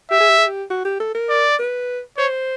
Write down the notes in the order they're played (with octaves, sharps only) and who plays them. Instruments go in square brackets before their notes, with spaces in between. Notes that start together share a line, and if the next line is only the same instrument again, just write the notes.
[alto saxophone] G4 [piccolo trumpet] E5
[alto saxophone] G#4
G4
G#4
G4
F#4
G4
A4
A#4
[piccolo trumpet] D5
[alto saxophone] B4
[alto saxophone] C5 [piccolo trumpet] C#5